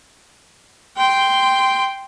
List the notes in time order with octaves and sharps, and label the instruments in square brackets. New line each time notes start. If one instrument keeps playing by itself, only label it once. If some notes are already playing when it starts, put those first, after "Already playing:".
[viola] G5 C6